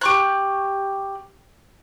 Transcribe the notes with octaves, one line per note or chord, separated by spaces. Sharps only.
G4 C#6 F#6